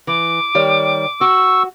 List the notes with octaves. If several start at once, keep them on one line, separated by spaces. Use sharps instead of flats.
E3 D6
D#3 G3 C#5
F#4 C#6 E6